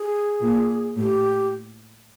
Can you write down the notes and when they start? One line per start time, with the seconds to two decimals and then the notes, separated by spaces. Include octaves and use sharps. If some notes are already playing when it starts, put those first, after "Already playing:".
Already playing: G#4
0.40 A#2
0.97 A2 G4